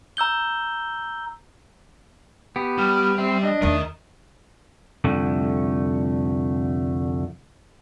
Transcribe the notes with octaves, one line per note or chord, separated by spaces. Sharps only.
A#5 E6 G6 G7
B3 G4
G3 F6
C4 E5
D4 D#5
E2 D#3 A3 A#4 D#5
C2 F2 D3 A3